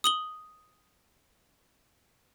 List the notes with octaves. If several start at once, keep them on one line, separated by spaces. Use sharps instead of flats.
D#6 F#7 G7